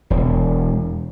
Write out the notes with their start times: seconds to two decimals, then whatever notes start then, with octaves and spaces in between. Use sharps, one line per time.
0.10 E1